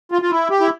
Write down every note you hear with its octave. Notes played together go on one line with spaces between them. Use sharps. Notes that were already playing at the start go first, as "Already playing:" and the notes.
F4
F4
E4
G4
E4